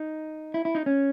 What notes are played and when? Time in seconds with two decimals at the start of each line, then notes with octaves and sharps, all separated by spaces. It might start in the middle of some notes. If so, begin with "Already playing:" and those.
Already playing: D#4
0.54 E4
0.65 E4
0.75 D#4
0.86 C#4